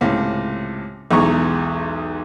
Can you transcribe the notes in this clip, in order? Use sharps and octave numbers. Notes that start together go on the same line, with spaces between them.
C#2 A2 C3
B1 E2 G#3 A#5 C#6